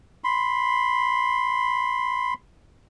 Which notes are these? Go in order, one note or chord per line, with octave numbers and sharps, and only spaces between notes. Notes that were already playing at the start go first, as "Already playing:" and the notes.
B5 C6